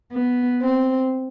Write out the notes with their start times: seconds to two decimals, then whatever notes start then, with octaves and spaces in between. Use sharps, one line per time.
0.12 B3
0.62 C4